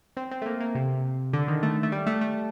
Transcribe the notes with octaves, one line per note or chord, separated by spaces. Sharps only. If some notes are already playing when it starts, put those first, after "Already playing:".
C4
C4
A3
A#3
A#3
C3
D3
D#3
A3
A3
G3
A3
A3